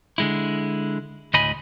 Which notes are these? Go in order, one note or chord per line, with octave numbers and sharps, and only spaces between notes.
D3 G#3 E4
D2 A2 D#5 G#5 B5